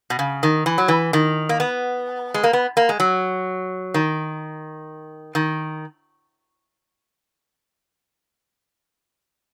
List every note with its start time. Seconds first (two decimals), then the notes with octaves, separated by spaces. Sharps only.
0.10 B2
0.19 C#3
0.43 D#3
0.66 E3
0.78 F#3
0.88 E3
1.13 D#3
1.49 A#3
1.60 B3
2.34 G#3
2.43 A#3
2.53 B3
2.77 A#3
2.89 G#3
3.00 F#3
3.94 D#3
5.35 D#3